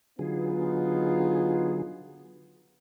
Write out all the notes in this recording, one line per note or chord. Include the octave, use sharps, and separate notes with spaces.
D3 F#3 B3 D#4 F4 G#4